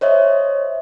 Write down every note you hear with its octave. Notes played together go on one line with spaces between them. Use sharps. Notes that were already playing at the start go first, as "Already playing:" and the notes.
C5 C#5 D#5 E5